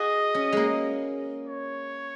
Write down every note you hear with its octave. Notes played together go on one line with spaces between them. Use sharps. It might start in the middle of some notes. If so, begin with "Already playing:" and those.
Already playing: F#4 G#4 D#5
C#4
G#3 A#3
C#5